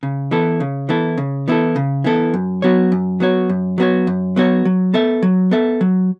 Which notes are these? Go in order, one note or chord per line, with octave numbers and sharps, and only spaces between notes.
C#3
E3 B3 E4 A4
C#3
E3 B3 E4 A4
C#3
E3 B3 E4 A4
C#3
E3 B3 E4 A4
F#2
F#3 B3 F#4 C#5
F#2
F#3 B3 F#4 C#5
F#2
F#3 B3 F#4 C#5
F#2
F#3 B3 F#4 C#5
F#3
B3 A4 E5
F#3
B3 A4 E5
F#3